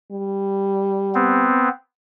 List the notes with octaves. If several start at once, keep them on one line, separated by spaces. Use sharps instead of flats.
G3
B3 C4